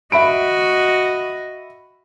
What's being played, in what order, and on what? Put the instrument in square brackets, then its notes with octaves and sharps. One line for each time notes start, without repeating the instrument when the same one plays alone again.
[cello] F#4 D#5 [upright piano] E5 B5 D7